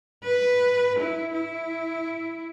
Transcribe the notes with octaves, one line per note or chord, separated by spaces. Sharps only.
B4
E4
E4